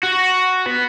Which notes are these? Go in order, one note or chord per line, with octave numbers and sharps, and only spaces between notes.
F#4
B3